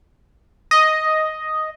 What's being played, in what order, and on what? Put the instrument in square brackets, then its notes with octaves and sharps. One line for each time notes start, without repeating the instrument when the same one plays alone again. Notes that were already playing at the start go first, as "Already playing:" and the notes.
[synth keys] D#5